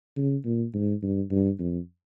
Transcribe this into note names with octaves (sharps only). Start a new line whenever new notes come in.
C#3
A#2
G#2
G2
G2
F2